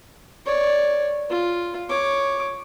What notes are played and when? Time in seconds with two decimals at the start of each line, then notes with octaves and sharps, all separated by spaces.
0.46 C#5 D5
1.30 F4
1.89 C#5 D6